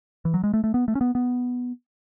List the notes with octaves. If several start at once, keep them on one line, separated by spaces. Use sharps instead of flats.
E3
F#3
G#3
A3
A3
B3
A3
C#4
B3
B3